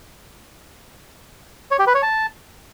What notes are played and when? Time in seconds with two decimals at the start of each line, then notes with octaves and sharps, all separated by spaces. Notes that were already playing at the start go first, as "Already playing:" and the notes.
1.71 C#5
1.79 G4
1.87 B4
1.95 C#5
2.02 A5